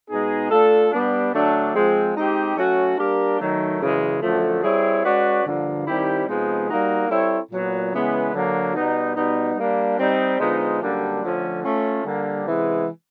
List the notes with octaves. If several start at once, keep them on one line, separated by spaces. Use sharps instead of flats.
B2 G#3 B3 D#4 G#4
A3 D4 F4 A4
G3 B3 D4
D3 F#3 A3 D4
F3 G#3 C4
G#3 C4 D#4 G4
F#3 A3 C#4 F#4
G3 A#3 D4 G4 A#4
D#3 F#3 A3
F#2 C#3 E3 G#3
F#2 D3 F3 A3
G3 C4 E4 G#4 C#5
G#3 C#4 F#4 B4 D5
G2 D3 F3 A#3
D#3 G3 C4 E4 G4
C3 F3 G#3 B3 D#4
G3 A#3 D#4 F#4
G3 C4 E4 A4 C#5
A#2 F#3 B3
C#3 E3 G#3 B3
D3 F#3 A#3
B2 G3 B3 D#4
B2 G3 B3 D#4
G3 A#3 D4
G3 C4 D#4
D3 F3 G#3 B3 D#4
F#2 D3 G3 A#3 D4
D3 F3 A3 C#4
A3 C#4 F4
D3 G3 A#3
C3 E3 G#3 B3